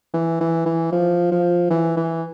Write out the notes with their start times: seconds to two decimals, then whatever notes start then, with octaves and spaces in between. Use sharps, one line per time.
0.14 E3
0.41 E3
0.66 E3
0.92 F3
1.32 F3
1.70 E3
1.97 E3